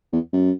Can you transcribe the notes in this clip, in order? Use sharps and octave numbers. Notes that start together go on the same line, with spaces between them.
E2
F#2